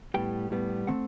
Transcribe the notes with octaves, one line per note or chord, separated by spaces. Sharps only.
A2 G3 B3 G5
A2 G3 B3
D#3 A3 C4 F#5